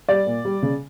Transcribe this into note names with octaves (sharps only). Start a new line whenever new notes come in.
G3 D5
A#2
G3
C#3